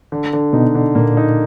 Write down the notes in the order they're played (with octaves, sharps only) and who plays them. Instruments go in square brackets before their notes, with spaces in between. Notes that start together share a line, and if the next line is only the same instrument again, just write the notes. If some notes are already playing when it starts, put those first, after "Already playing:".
[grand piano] D3
D3
[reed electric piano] B2 [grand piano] D#4
[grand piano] D3
[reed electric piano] A#2 [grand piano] A#3
[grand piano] D#4